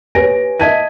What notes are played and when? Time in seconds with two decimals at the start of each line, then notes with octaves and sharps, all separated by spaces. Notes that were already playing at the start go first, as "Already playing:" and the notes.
0.15 G4 B4 C#5 G#5 A#6 D7
0.60 D#5 E5 A5 G#6 B6 D#7